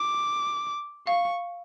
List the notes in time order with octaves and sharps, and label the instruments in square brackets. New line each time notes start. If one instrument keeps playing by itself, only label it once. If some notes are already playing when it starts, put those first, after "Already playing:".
Already playing: [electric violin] D6
[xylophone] F5 [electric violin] C#6